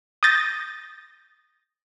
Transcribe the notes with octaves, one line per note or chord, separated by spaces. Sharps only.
D#6 G6 A6 A#6